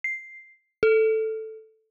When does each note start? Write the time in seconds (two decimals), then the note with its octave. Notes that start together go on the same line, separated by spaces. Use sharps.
0.04 C7
0.83 A4